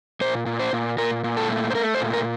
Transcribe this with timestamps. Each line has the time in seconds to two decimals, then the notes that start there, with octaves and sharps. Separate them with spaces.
0.21 A#2 C5
0.46 A#2
0.59 C5
0.73 A#2
0.98 A#2 A#4
1.24 A#2
1.37 A4
1.49 A3
1.70 C5
1.75 A3 A#4
1.95 C5
2.01 A#2
2.13 A#4